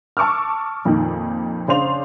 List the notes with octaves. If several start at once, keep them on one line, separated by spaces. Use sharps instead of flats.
A5 C#6 D6 E6 F6
F2 A#2 D#3
C#3 D4 C5 F5 C6 F7